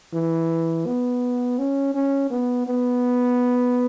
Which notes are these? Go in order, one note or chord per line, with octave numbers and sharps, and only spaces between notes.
E3
B3
C#4
C#4
B3
B3